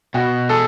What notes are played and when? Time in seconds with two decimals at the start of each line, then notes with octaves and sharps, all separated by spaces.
0.14 B2 F#4
0.49 G#4 A4